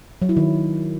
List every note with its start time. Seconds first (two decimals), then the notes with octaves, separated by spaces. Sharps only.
0.22 F#3
0.29 E4
0.37 D#3